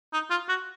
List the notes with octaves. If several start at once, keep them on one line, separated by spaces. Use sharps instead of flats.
D#4
F4
F#4